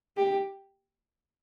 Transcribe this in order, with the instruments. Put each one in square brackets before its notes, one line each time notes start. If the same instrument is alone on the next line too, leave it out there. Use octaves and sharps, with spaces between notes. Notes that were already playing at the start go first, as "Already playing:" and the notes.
[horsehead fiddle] G4